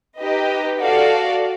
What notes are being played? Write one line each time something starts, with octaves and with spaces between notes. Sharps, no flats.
D#4 G4 B4 D#5
F#4 A4 D5 F5